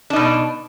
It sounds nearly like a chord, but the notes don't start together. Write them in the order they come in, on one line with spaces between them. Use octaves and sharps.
D4 D#4 B2